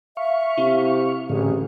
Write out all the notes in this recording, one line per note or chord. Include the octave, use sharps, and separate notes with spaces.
E5 F5 C#6
C3 E4
A1 A2 D3 G#4